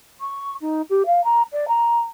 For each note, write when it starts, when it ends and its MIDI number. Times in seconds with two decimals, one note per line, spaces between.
0.21 0.54 85
0.61 0.82 63
0.90 1.03 67
1.06 1.24 77
1.24 1.42 82
1.52 1.66 74
1.68 2.01 82